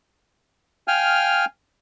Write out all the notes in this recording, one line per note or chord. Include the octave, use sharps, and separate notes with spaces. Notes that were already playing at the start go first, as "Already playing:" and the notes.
F5 G5 G#5 F6